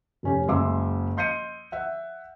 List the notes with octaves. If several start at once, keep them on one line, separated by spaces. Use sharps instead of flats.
F1 C#4 G4
F#1 G#3 E5 C6 D6 E6
D#5 C6 G6 C7 C#7 D#7
E5 F#5